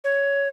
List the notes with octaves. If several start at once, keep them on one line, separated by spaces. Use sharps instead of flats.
C#5